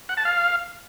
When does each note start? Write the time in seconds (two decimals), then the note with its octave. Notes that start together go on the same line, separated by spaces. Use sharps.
0.09 F#5
0.17 A5
0.25 F5